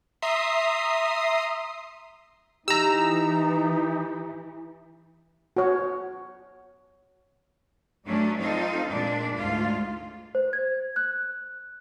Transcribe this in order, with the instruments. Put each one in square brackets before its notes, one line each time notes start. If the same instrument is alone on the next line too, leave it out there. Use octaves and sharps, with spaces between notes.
[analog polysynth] E5 A#5 C6 D#6 C7
[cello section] E3 [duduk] D#4 [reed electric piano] G4 [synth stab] A#5 E6
[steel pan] F#4 C#5
[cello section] G2 F#3 A3 C#4 D4
C4 D4 D#4 F4 A4
A#2 G#3 D4
D2 G#2 F4
[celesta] C5
G#6
F#6